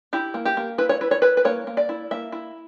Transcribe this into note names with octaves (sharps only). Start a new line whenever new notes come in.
E4 G4
A#3
G4
A#3
E4 B4
C#5
E4 B4
C#5
E4 B4
B4
A#3 C#5
A#3
D5
E4
A#3 E5
E4